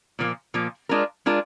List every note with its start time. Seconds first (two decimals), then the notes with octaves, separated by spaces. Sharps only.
0.19 A#2 F3 A#3
0.54 A#2 F3 A#3
0.89 G#3 D4 F4 A#4
1.26 G#3 D4 F4 A#4